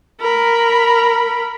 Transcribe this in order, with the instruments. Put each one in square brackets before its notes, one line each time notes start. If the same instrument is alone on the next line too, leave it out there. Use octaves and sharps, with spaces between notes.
[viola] A#4 B5